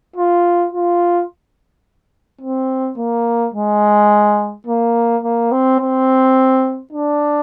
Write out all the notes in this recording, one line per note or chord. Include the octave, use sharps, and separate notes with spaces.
F4
F4
C4
A#3
G#3
A#3
A#3
C4
C4
D4